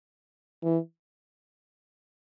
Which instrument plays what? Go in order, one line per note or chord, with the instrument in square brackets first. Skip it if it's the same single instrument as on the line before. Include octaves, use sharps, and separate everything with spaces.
[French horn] E3